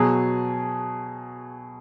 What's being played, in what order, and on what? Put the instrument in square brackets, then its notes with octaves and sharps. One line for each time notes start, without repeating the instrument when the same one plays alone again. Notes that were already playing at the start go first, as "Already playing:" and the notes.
Already playing: [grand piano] B2 F#3 G#4